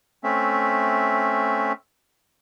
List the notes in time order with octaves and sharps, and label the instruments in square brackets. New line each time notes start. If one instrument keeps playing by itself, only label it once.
[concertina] A3 C4 C#4 E5